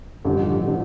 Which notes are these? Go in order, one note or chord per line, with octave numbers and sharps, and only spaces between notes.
A1 G2 D3 F3
D3 F3